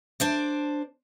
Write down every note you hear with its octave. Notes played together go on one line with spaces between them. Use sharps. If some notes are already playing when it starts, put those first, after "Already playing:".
D4 C5 D5